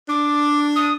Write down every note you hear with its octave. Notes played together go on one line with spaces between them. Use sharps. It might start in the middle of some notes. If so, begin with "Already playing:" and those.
D4 D6
D#6